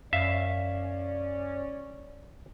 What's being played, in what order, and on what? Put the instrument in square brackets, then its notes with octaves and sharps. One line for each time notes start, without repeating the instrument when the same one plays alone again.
[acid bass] F#2 [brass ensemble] C#4 D5 [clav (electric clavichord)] E5 [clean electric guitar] F5